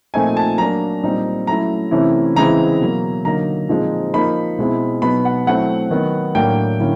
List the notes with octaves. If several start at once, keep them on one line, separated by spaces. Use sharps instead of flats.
A#2 F3 A3 C4 D#4 G#5
A5
F#3 A#3 D4 A#5
A#2 G3 C4 D#4
F#3 A3 C#4 E4 A#5
C3 E3 A3 C#4 E4
C#3 E3 G#3 C4 E4 A#5
B2 F#3 A#3
D3 F#3 A#3 D#4 A#5
A#2 F3 G#3 C4 D#4
F3 A#3 D#4 B5
B2 G#3 C4 E4
B2 F#3 B3 D#4 B5
F#5
F#3 A3 C4 E4 F#5
D#3 F#3 B3
A2 F#3 A#3 D4 G5
D3 F#3 A#3 C#4 E4